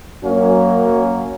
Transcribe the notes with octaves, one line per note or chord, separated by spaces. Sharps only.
F#2 F#3 A#3 C#4